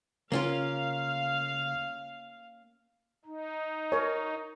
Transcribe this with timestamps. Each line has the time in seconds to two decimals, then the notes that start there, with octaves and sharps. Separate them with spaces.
0.32 C#3 A#3 C#4 F4 F5
3.25 D#4
3.92 A#4 C#5